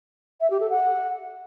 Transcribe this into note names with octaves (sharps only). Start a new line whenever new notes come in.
E5
G4
A4
F#5